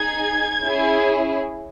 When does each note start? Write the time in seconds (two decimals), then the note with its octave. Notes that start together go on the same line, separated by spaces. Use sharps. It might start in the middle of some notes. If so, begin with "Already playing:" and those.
Already playing: D#4 G#4 G#6
0.65 C#4 E4 G#4